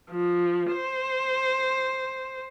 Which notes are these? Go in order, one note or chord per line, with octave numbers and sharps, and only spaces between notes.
F3
C5